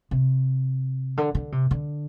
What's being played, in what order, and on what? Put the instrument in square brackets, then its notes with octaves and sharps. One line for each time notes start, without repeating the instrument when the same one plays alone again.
[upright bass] C3
D3
D3
C3
D3